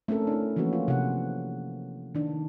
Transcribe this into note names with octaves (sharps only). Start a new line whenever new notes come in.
A3 C4 C#4 A4 A#4
D4 E4
E3 F3 A#3 C#4 F#4 B4
F4
C3 F4 F#5
D#3 D4